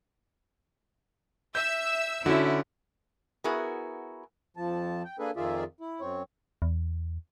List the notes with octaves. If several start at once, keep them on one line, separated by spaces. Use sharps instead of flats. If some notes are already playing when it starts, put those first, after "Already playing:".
E5 E6 G6
D3 C#4 E4 F#4
B3 E4 F#4 G#4 A#4
F2 F3 A5
G5
A#3 D4 G#4 A4 B4 G#5
F2 D#3 F4 G#4 D5 E5
E4
F#2 C4 C#5
E2